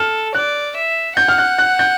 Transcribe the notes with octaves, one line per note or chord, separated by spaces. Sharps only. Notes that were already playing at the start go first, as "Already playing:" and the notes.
Already playing: A4 F6
D5 F#6
E5
F#5 G6
F6
F#6
F#6
G6